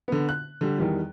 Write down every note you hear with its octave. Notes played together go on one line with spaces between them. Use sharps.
D3 B3
F#6
D3 G3
E2 D#3 G3